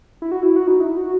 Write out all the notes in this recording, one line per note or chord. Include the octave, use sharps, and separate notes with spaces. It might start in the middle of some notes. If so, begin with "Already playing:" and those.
E4
F#4
E4
F#4
D#4
E4
F#4